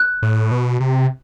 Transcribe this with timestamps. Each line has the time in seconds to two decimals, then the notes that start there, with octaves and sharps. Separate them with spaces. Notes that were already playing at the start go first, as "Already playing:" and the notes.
Already playing: F#6
0.23 A2
0.51 B2
0.80 C3